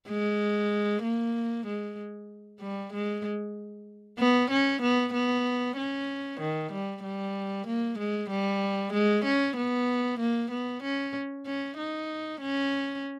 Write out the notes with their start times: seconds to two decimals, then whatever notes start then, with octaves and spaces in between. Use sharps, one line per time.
0.08 G#3
1.03 A#3
1.66 G#3
2.61 G3
2.93 G#3
4.19 B3
4.51 C#4
4.82 B3
5.13 B3
5.77 C#4
6.40 D#3
6.72 G3
7.03 G3
7.67 A#3
7.98 G#3
8.30 G3
8.93 G#3
9.24 C#4
9.56 B3
10.20 A#3
10.51 B3
10.83 C#4
11.46 C#4
11.77 D#4
12.41 C#4